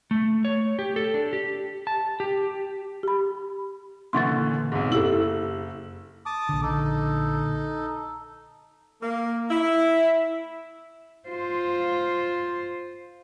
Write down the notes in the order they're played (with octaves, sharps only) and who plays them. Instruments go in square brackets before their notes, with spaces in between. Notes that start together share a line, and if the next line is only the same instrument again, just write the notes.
[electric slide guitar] A3
C#5
G4
A4
D4
G4
A5
G4
[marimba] G4 B5
[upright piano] A#2 D3 E3 [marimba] C6 C#6 A6
[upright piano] B1 F2 G#2
[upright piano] F#1 E6 F#7 [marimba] E4 G4 A4
[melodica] A5 D6 D#6
[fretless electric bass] A#1 D3
[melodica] D#4 A4
[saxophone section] A#3
E4
[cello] F4 C5